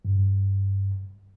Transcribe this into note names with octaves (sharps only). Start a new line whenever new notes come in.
G2